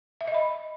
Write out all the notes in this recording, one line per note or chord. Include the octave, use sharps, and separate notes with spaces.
E5
D#5
B5